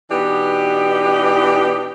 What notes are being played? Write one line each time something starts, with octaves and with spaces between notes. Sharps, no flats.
B2 E3 B3 D4 D#4 G4